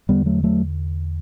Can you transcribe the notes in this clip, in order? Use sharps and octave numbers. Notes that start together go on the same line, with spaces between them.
E2 D3 G3 B3
F#3 A3
F#3 A3